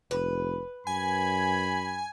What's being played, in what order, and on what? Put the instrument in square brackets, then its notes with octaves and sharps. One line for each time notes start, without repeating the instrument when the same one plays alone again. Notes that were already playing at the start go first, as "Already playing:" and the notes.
[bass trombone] F1 [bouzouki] B4
[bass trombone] F#2 [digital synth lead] G#5 [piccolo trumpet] B5